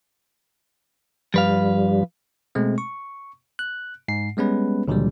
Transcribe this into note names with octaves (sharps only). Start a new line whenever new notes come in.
G2 F3 G3 B4 F5
B2 G#3 A3 C4
C#6
F#6
G#2 C7
G3 G#3 B3 C#4 B4
C#2 A#2 D3 E3 F#3 G3